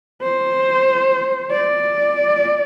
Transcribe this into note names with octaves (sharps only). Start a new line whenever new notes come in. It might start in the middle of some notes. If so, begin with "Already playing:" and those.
C5
D5